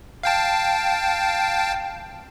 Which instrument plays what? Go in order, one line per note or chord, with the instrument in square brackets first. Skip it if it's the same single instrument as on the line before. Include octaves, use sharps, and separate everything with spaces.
[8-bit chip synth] F5 G5 A5